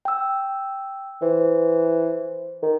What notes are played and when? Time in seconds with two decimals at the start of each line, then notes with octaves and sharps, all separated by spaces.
0.05 G5 E6
1.22 E3 C5
2.62 D#3